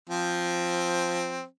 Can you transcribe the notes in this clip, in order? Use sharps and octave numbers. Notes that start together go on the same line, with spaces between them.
F3 C4